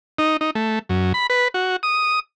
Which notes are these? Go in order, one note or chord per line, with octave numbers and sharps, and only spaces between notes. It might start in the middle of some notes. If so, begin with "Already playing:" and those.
D#4
D#4
A3
F#2
B5
B4
F#4
D#6